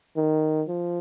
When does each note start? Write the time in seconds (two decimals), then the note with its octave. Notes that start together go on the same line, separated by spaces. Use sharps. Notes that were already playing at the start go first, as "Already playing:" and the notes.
0.17 D#3
0.68 F3